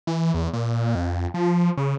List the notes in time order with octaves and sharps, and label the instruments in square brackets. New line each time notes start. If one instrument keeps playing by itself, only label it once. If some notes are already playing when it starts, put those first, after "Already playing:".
[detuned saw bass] E3
E2
A#2
F2
F3
C#3